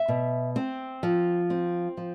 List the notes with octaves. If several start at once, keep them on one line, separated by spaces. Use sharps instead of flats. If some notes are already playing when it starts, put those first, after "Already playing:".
Already playing: E5
B2
C4
F3
C4
F3